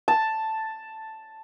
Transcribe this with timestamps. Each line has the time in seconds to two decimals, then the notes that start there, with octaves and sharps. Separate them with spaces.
0.08 A5